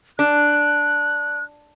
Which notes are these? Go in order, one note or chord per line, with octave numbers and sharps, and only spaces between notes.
D4 F#6